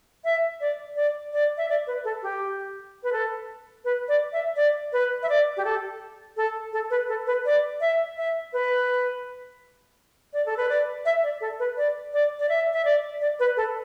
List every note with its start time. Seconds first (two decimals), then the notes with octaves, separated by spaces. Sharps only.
0.24 E5
0.61 D5
0.96 D5
1.33 D5
1.57 E5
1.69 D5
1.87 B4
2.04 A4
2.23 G4
3.03 B4
3.13 A4
3.85 B4
4.08 D5
4.33 E5
4.56 D5
4.93 B4
5.23 E5
5.29 D5
5.57 G4
5.65 A4
6.37 A4
6.73 A4
6.90 B4
7.08 A4
7.27 B4
7.45 D5
7.81 E5
8.17 E5
8.53 B4
10.33 D5
10.46 A4
10.57 B4
10.69 D5
11.05 E5
11.23 D5
11.41 A4
11.59 B4
11.77 D5
12.13 D5
12.39 D5
12.49 E5
12.73 E5
12.85 D5
13.21 D5
13.40 B4
13.57 A4